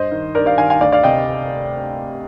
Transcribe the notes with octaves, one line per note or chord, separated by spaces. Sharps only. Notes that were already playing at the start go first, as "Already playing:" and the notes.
Already playing: G2 C5 D#5
D#3
G2 A#4 D5
D5 F5
D#3 F5 G#5
F5 G#5
D2 D5 F5
D5 F5
C3 D#5 G5